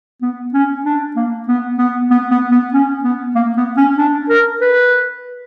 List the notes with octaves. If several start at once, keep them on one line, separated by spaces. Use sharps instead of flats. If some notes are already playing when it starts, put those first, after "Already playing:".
B3
C#4
D4
A#3
B3
B3
B3
B3
B3
C#4
B3
A#3
B3
C#4
D4
A#4
B4